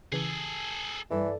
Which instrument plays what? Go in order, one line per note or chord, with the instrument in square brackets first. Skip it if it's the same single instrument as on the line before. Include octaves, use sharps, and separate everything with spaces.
[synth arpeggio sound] C#3 E3 [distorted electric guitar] G#4 A4
[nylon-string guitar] G2 A4 D5 [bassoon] E3